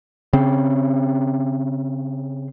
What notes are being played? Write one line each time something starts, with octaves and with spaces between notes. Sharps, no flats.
C#3 C4